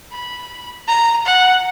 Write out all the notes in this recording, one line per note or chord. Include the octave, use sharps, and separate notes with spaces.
B5
A#5
F#5